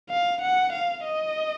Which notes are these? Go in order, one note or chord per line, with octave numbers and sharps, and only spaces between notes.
F5
F#5
F5
D#5